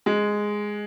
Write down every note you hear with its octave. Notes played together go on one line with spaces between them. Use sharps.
G#3